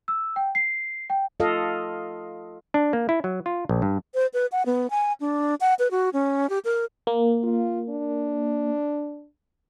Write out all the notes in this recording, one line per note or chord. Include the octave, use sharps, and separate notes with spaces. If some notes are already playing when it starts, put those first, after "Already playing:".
E6
G5
C7
G5
F4 A4 D#5 F5
D4
A#3
E4
F#3
F4
A#1
G2
C5
B4
F#5
B3
G#5
D4
F#5
B4
F#4
C#4
G4
A#4
A#3
F4
D4